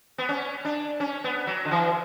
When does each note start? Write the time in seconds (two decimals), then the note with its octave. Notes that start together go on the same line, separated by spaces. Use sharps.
0.18 B3
0.29 C#4
0.65 D4
1.00 C#4
1.24 B3
1.47 F#3
1.65 D3
1.71 E3